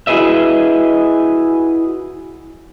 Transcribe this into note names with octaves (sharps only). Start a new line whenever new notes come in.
E4 F#4 G#4 B4 D#5 E5